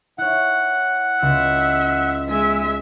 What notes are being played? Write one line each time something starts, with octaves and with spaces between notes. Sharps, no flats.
E4 C#5 F#5
C#2 E5
G#3 E5